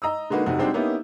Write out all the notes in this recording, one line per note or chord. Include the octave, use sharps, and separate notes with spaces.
D#5 A#5 D#6 E6
D3 G#3 A#3 D#4 F#4 B4
F1 C3 D#4 F#4
G3 G#3 C4 D4 D#4 F#4
A#3 B3 C#4 D#4 E4 G4